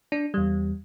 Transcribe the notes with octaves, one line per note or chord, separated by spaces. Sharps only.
D4
E2 G3